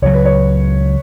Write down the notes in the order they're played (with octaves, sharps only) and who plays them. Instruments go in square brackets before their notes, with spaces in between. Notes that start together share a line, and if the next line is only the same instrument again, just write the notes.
[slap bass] C#2 C#3 F#3 [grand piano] C#5
[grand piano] B4
C#5